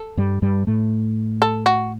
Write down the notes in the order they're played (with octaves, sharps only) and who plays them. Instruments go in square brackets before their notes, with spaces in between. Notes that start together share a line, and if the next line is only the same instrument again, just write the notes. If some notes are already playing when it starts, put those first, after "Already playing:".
Already playing: [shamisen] A4
[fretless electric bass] G2 G3
G2 G3
A2 A3
[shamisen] A4
F#4